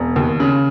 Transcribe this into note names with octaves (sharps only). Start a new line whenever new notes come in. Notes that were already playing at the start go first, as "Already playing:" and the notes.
Already playing: E1
D#2
C#3